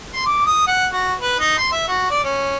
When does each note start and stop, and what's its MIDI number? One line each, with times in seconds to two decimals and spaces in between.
0.14 0.25 84
0.26 0.45 86
0.46 0.64 87
0.67 0.87 78
0.93 1.13 66
1.20 1.39 71
1.40 1.55 63
1.58 1.72 84
1.72 1.84 76
1.88 2.07 66
2.10 2.20 74
2.24 2.57 61